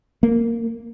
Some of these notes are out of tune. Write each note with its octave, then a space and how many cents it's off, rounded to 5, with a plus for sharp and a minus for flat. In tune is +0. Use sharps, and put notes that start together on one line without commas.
A#3 -10